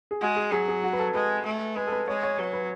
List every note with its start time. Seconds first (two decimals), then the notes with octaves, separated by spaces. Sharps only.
0.11 G#4
0.21 G#3 F#4
0.36 G#4
0.52 F#3 G#4
0.68 G#4
0.84 F#4
0.93 B4
0.99 A4
1.14 G#3 B4
1.45 A3
1.76 G#3 B4
1.87 A4
1.92 B4
2.08 G#3 C#5
2.23 C#5
2.38 F#3 B4
2.53 B4